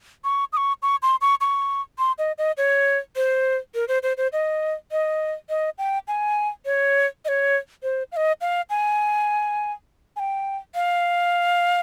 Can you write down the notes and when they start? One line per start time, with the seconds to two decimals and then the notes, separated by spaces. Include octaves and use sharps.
0.24 C#6
0.53 D#6
0.57 C#6
0.83 C#6
1.03 C6
1.21 C#6
1.41 C#6
1.99 C6
2.18 D#5
2.38 D#5
2.57 C#5
3.16 C5
3.75 A#4
3.88 C5
4.03 C5
4.17 C5
4.33 D#5
4.91 D#5
5.49 D#5
5.78 G5
6.08 G#5
6.65 C#5
7.25 D#5
7.28 C#5
7.83 C5
8.12 F5
8.17 D#5
8.41 F5
8.70 G#5
10.16 G#5
10.20 G5
10.75 F5